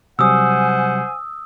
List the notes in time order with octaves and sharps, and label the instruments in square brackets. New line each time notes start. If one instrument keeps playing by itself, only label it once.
[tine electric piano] C3 F#3 G3 [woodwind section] C5 F#5 G#5 [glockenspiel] D#6 E6